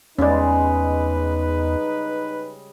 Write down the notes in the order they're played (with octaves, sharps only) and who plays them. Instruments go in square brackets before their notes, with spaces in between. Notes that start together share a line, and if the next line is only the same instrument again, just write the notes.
[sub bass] E2 [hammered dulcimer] C#3 G3 G#3 [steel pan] C#4 D5 [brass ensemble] D#4 B4